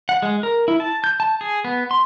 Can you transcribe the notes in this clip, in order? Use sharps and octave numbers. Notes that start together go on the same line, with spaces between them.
F#5
G#3
A#4
E4
A5
G6
A5
G#4
B3
C6